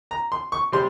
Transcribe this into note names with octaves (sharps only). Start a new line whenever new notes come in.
A#5
C6
C#6
C3 G3 C6